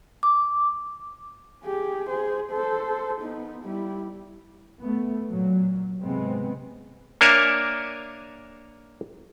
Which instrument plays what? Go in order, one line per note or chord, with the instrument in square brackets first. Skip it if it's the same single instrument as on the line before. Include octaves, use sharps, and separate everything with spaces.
[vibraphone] D6
[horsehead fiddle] G4 G#4
G#4 C5
A4 C5
B3 D#4
G3 E4
[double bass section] A3 B3
A#2 F#3
G#2 C3 G#3 B3 C4
[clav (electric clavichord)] A#3 D4 A#4 C#5 E5 G#5